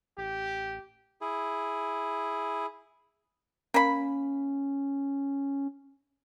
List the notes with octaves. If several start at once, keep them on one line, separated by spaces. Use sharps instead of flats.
A1 G4
E4 G#4
A#3 C#4 B5